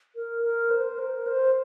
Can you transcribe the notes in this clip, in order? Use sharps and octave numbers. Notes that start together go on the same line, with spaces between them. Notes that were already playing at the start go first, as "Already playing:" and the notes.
A#4
A#4
C5
A#4
C5